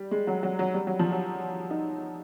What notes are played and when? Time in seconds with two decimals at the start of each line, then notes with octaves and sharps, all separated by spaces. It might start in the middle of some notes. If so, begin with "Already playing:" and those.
Already playing: G3
0.11 G#3
0.27 F#3
0.43 F#3
0.59 F#3
0.74 G3
0.87 F#3
0.99 F3
1.12 F#3
1.71 D#4